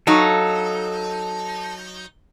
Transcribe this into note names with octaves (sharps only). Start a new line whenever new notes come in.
F#3 D#4 A4 F5